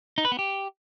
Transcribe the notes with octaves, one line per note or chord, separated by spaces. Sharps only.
D#4
B4
B3
G4